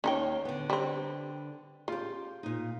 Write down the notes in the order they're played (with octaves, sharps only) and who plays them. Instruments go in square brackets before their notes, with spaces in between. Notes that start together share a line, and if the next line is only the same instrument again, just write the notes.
[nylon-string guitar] D#2 C#5 [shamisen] C#4 D#4 G5
[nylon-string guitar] D3 B3
[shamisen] G3 C4
[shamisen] C#3 [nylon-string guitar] F4 G4
[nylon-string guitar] A#2 D#4